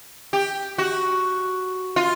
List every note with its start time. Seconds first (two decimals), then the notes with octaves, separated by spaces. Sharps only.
0.33 G4
0.78 F#4
1.96 F4